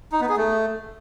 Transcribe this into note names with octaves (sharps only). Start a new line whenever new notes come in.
D#4
B3
G#4
A3